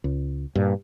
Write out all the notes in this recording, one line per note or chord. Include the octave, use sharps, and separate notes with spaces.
C#2
G2 A#2